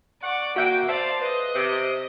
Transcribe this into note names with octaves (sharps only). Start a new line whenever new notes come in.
D5 F#5 C#6
A#3 F#4 E5 F#5 G5
C5 D5 E5 F5 A5
B4 D#5
C3